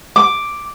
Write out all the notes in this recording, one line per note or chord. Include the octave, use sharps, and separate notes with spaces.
D6